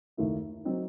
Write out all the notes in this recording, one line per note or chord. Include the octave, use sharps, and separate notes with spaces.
D#2 D#3 A3 E4
F#3 C4 D#4